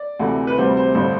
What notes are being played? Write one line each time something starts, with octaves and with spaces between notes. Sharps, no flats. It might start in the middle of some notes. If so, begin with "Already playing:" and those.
Already playing: D5
D2 C3 E3 A3
B4
D2 C3 E3 G3 C5
C5
A1 G2 D3 C5